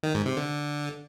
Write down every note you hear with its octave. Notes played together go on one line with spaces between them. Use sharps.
D#3
G#2
C3
D3